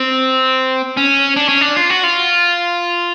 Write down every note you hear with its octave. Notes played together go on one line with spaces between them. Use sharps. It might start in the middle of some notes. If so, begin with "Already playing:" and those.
Already playing: C4
C#4
D4
C#4
D4
F4
F#4
F4